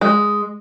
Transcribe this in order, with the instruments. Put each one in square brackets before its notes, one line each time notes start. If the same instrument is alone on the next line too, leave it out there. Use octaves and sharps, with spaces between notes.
[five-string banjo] G#3